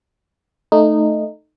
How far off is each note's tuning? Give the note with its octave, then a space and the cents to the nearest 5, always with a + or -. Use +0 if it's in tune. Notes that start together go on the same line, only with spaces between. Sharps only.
A3 +0 D#4 -15